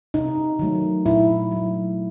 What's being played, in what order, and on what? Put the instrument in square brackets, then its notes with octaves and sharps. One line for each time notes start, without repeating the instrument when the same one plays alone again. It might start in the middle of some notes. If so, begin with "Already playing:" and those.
[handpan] C3 D#4
D#3 F#3 A3
A#2 E4
F#3 A3